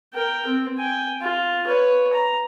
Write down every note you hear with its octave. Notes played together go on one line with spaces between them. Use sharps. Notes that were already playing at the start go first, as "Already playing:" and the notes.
A#4 G5
C4
G5 G#5
F4
B4 C#5
A#5